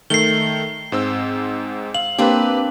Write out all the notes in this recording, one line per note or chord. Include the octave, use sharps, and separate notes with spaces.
D#3 A3 C7 G7
G#2 C4 E6
F5 F#7
A#3 C4 D4 G4 B4